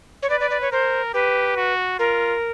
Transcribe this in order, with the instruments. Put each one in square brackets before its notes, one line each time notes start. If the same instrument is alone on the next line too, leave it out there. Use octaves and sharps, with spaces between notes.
[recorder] C#5
[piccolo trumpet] B4 [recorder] D5
[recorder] D5
D5
C#5
[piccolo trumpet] A#4 [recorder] C5
[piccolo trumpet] G4 [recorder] B4
[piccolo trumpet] F#4
[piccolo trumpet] F4 [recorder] A#4